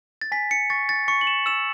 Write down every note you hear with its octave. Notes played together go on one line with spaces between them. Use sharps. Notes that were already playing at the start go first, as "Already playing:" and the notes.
A6
G#5 B6
C#7
C#6 A6
A6
C#6 C#7
F#7
E7
E6 E7